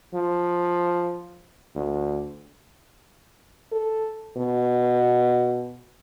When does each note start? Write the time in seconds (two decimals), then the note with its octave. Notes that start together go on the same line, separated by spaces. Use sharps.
0.14 F3
1.75 D2
3.72 A4
4.37 B2